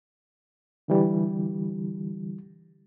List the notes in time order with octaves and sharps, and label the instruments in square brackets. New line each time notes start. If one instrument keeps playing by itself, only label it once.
[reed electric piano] D3 E3 G3